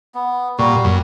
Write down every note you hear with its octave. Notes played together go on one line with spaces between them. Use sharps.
B3
A#2 G3 F#4
F#2